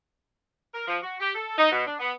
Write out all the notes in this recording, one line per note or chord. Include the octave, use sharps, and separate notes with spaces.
A#4
F3
F#4
G4
A4
D#4
B2
D4
B3